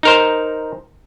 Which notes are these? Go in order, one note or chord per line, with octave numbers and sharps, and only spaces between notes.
D#4 A#4 C5